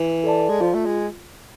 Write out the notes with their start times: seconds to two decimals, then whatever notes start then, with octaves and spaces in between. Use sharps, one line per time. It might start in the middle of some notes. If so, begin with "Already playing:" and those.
Already playing: E3
0.24 A4 D5 A5
0.49 G#3
0.61 F3 F4
0.74 A3
0.86 G#3